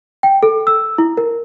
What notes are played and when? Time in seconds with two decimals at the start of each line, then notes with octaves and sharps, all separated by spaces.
0.23 G5
0.43 A4
0.67 E6
0.98 E4
1.17 A#4